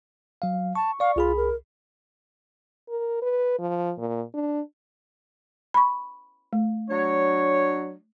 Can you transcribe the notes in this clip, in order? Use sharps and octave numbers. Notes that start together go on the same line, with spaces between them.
F#3 F5
A5 C#6
D5 F5 C#6
C2 F4 G#4 B5
A#4
A#4
B4
F3
A#2
D4
B5 C#6
A3
F#3 D4 C#5